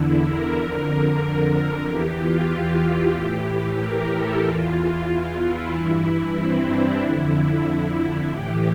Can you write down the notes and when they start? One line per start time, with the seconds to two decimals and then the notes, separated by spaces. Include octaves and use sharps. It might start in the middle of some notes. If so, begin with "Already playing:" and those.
Already playing: E2 D3 E4
0.26 A#4
0.58 F2 D3
1.86 E2 E3 G4
2.18 F4
2.50 G4
3.15 A2 E3
3.79 A#4
4.12 A4
4.43 E2 E3 F4
5.07 F4
5.40 E4
5.72 G2 E3 E4
6.36 C4
6.68 D4
7.01 F2 D3 E4
8.29 A2 E3 G4